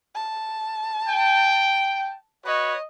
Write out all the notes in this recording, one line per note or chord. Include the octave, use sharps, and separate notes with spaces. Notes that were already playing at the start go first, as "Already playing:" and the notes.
A5
G5
F#4 B4 C#5 D#5